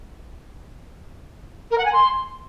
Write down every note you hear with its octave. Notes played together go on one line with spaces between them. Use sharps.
A#4
F#5
G#5
C6